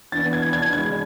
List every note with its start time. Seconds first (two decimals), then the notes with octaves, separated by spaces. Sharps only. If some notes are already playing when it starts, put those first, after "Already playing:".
0.12 E3 B3 D4 A6
0.33 G#6
0.53 G#6
0.72 G#3 D4 G#6